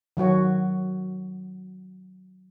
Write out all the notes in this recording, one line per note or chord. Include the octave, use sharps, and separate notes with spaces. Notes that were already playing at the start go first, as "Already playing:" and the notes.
D#3 F#3 F#4 C#5